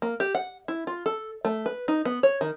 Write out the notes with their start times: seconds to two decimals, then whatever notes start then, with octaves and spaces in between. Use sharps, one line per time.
0.02 A#3
0.20 G4
0.35 F#5
0.68 E4
0.87 F4
1.06 A4
1.45 A3
1.66 B4
1.88 D#4
2.05 B3
2.23 C#5
2.41 D#3